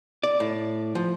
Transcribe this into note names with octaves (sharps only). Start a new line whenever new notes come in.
D5
A2
F3